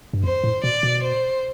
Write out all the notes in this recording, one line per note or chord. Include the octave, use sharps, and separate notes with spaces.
G2
F2 C5
A2
B2 D5
B2
C5